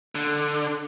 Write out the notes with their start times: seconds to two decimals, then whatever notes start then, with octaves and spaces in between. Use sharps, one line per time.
0.15 D3